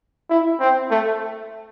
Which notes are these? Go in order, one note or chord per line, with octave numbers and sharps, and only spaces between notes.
E4
C4
A3